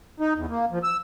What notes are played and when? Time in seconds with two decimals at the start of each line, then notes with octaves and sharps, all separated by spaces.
0.20 D#4
0.36 E2
0.49 A#3
0.71 F3
0.83 E6